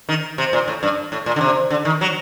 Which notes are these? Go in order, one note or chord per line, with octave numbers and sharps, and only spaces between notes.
D#3
C3
A#2
A2
G2
A2
A#2
D3
C3
D3
D#3
F#3